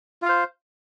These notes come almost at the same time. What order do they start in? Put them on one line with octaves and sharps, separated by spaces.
F4 F5 C5